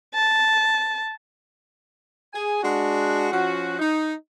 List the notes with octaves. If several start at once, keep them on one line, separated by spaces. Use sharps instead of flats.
A5
G#4 G#5
G#3 D4 F#4
F3 C#4 F#4
D#4